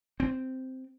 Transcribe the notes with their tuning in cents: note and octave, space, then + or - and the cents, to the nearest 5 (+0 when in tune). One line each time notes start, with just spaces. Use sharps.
C4 -10